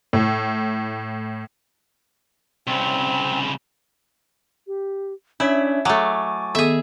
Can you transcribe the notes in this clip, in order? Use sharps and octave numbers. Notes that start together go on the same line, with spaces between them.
A2
C2 C#3 C4
G4
C#4 D4 E4 C#5 E5
F#3 A3 G#5 C#6 D6
D#3 B3 G#4 A4 E5